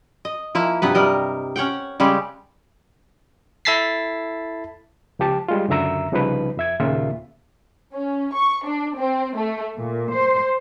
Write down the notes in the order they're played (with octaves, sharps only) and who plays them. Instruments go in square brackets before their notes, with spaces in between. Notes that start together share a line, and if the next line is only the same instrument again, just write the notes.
[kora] D#5
F3 A#3 E4
G2 C3 B3 B4
G3 A#4 D#5
C#4 C#5 F#5 G5
C#3 G3 G#3 G4
[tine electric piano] E4 A4 A5 A6 B6 C7
[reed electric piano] C#2 F3 G4 A5
G3 G#3 F4
C#2 F#2 D3 E5 A#5 E6
C2 C#3 F3 G3 D#4 B4
F2 E5 G#6
D#2 A#2 C#3 F4 E5
[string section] C#4
C#6
D4
C4
A3
A#2
C5